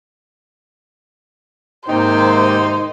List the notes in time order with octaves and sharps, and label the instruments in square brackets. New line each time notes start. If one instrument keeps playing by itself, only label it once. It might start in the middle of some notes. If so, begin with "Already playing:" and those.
[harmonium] G#2 A#3 G5 [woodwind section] C3 D#3 [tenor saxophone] D#4 [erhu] C5